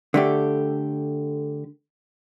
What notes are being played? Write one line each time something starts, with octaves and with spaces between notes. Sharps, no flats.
D3 A3 G4